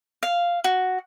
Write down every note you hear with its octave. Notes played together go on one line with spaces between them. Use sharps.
F5
F#4